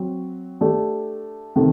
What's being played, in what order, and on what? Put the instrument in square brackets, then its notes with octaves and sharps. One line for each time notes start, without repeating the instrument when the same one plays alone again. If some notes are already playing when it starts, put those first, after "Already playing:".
Already playing: [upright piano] F#3 C4
A3 D4 G4 D5
C3 D#3 A3